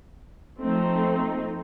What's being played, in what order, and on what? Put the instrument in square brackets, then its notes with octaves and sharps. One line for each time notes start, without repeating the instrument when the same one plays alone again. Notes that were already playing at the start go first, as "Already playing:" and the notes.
[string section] F3 A3 C4 D#4